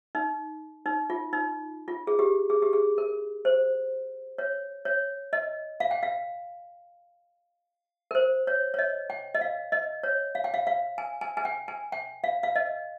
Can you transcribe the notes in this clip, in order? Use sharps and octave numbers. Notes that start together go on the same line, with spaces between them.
D#4
D#4
F4
D#4
F4
G#4
G4
G#4
G4
G#4
A#4
C5
C#5
C#5
D#5
F5
G5
F5
A#4
C5
C#5
C#5
D#5
G5
D#5
F5
D#5
C#5
F5
G5
F5
F5
G#5
G#5
G#5
G5
G#5
G5
F5
F5
D#5